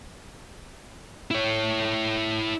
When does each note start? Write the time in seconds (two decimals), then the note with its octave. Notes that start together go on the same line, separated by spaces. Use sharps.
1.31 E4 C#5